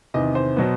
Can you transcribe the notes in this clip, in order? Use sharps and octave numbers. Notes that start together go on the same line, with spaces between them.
E2 C3 D#3 D#5
C5
B2 F#3 B3